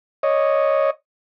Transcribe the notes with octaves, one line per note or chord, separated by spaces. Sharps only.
C#5 D#5